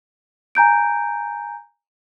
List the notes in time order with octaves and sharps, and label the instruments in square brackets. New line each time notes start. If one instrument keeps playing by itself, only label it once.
[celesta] G#5 A#5 G6 D7